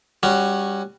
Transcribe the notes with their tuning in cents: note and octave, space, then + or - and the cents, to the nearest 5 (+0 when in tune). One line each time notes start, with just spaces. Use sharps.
G3 +15 C#4 +0 F#4 +0